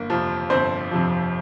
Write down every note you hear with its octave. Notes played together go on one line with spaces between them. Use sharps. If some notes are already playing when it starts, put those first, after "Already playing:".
Already playing: G1 A#3
F2 C3 F3
G1 C4 C5
F2 C3 F3